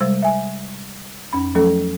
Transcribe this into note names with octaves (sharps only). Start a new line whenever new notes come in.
C3 G3 G#3 C5 E6
E5 G#5
F2 C#4 B5
F3 F#3 A3 C#4 A4